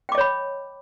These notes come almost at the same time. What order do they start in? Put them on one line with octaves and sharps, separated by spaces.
G5 D6 D#5 C#5 B5